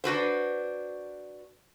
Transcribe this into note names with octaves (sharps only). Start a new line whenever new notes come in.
D4 F#4 B4 C5